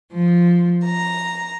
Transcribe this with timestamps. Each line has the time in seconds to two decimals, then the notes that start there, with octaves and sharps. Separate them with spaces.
0.13 F3
0.85 A#5